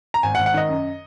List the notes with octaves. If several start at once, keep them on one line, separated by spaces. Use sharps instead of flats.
A#5
G#1 G#5
F#5
G#1
F#5
D#3 D#5
F#2